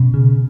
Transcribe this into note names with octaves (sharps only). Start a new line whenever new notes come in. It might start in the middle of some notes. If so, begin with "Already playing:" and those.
Already playing: B2 C#4
C#3